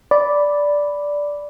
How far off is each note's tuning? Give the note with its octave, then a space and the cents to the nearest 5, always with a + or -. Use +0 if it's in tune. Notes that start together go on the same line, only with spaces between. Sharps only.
D5 -5 B5 +0